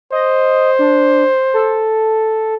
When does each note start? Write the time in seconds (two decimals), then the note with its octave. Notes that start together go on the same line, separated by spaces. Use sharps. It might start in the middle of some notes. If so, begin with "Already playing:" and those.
0.12 C5 D#5
0.79 D4
1.54 A4